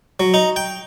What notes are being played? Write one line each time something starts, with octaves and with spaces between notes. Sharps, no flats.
F#3
D#4
G5